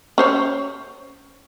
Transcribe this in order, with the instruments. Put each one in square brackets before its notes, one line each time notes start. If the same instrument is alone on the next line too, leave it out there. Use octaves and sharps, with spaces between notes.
[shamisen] C#4 C5 C#5